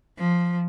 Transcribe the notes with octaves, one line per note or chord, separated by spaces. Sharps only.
F3